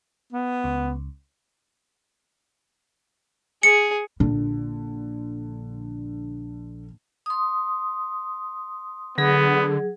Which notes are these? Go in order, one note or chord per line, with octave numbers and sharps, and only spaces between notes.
B3
C#2
G#4 C#7
A#1 A#2 D3
C6 D#6
D3 F#3 B3 G#4